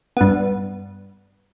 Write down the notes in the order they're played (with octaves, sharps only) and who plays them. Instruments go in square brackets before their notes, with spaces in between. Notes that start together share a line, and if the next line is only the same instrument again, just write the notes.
[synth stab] G2 B3